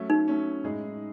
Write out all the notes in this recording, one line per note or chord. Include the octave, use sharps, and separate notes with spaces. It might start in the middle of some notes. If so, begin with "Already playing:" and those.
Already playing: F#3 A3 C#4
D#4
F#3 A3 C#4
A2 G#3 D#4 G#4